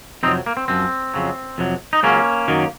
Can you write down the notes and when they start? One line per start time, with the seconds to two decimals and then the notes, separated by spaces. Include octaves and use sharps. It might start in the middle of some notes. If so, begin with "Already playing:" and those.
0.23 F2 C3 F#3 C4 D#4
0.46 A#3
0.57 C4
0.68 F#2 F3 C4
1.14 F2 C#3 F#3
1.58 F2 C3 F#3
1.93 D#4
2.03 C#2 C#3 F#3 A#3 C#4
2.48 F#2 D#3 F#3